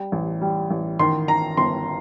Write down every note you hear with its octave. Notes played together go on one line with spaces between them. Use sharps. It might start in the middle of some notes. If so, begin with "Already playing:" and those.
Already playing: G3
A1
G3
A1
D#3 C6
D#3 A#5
G1 C6